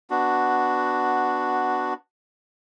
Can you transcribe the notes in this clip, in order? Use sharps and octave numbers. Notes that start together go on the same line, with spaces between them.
B3 D4 F#4